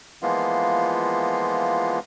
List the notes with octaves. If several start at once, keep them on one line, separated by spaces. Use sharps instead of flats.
E3 F3 G#3 A#3 B3 F4